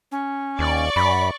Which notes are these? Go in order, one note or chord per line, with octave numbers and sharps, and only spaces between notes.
C#4
D#2 D5 C#6
F#2 B5